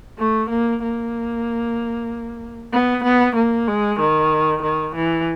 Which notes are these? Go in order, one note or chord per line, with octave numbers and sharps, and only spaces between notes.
A3
A#3
A#3
B3
B3
A#3
G#3
D#3
D#3
E3